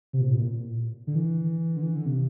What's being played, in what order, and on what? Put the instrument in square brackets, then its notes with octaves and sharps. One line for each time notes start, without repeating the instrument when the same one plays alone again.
[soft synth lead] C3
A#2
A2
A#2
D3
E3
D3
E3
D3
C3